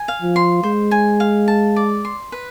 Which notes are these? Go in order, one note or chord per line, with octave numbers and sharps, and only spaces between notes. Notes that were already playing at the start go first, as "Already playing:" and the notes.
Already playing: G#5
F5
F3
C6
G#3 C5
G#5
F5
A5
D5
C6
B4